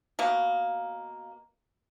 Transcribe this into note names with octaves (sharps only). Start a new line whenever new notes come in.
B2 A#3